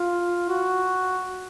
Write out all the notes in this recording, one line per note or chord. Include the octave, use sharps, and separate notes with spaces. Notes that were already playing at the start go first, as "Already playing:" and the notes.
Already playing: F4
F#4